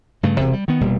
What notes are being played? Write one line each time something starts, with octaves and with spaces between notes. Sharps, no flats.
G2 C#3 A3
E1 C3
G3
D#3 B3
F1 B2 G3 A#3